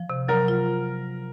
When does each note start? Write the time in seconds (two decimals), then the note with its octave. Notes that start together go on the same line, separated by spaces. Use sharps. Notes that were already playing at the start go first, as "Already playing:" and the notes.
Already playing: F3
0.10 C3
0.28 F#3 A#4
0.48 F4